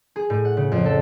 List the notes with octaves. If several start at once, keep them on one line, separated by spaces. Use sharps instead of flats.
G#4
A2
F#5
C#3
F2
A4